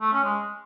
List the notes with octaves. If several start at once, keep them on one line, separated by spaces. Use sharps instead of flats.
A3
C#4
G#3